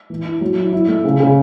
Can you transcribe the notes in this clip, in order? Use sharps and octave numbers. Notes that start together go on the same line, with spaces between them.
E3
E4
F#3
E4
E4
A3
C#3
C#3